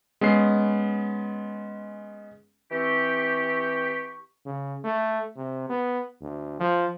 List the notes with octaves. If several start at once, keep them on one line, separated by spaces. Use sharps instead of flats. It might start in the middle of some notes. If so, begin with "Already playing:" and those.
G#3 B3 C#4 C7
E3 C4 G4 C#6
C#3
A3
C3
B3
D2
F3